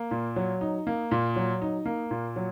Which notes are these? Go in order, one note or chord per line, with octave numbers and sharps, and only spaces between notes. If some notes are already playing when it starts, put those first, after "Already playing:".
Already playing: A#3
A#2
F#3
D#4
A#3
A#2
F#3
D#4
A#3
A#2
F#3